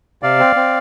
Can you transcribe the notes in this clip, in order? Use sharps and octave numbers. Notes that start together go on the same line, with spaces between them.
C3 D5 F5
C4
C4